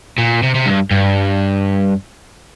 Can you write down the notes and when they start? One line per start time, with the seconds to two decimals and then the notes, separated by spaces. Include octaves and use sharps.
0.18 A#2
0.43 C3
0.55 C3
0.66 G2
0.91 G2